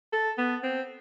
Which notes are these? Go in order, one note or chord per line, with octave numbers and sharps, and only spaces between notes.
A4
B3
C4